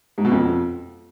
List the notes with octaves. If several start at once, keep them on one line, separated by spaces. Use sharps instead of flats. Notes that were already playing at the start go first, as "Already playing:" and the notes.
G#2
B2
F2